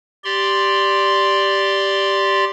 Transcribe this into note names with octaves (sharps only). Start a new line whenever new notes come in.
G4 D5 C6